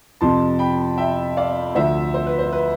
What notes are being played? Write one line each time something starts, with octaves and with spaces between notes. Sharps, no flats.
F2 C3 F3 A5 C6
G5 B5
E5 G5
D5 F5
D2 D3 F3 C5 E5
C5
B4
C5
B4